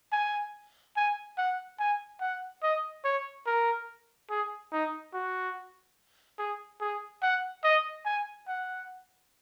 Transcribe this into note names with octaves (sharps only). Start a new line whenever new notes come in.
G#5
G#5
F#5
G#5
F#5
D#5
C#5
A#4
G#4
D#4
F#4
G#4
G#4
F#5
D#5
G#5
F#5